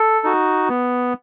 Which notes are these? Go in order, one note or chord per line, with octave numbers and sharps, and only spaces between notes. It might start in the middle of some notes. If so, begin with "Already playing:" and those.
Already playing: A4
D#4 F#4
B3